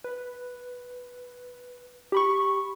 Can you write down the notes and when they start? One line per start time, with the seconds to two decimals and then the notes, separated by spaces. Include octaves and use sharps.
0.04 B4
2.12 G4 B5 C#6